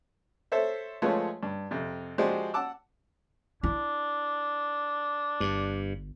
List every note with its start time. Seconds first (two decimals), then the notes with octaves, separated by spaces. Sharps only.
0.52 A4 C5 C#5 E5
1.02 F3 G#3 A3 F4 B4 C#5
1.43 G2
1.71 F2 C3
2.18 F3 G#3 F#4 G4 C5 D5
2.54 F#5 A5 D6 E6
3.63 D4 E4
5.40 G1 G2